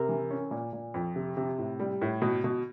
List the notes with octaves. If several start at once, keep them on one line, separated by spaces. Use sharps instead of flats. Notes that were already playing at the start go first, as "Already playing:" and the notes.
Already playing: C3 A#4
E3
C#4
A#2
A#2
F2
C3
C3
A2
G3
A2
B2
B2